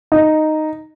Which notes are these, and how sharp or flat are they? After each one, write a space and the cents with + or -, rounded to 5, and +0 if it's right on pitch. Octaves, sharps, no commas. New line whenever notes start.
D#4 -5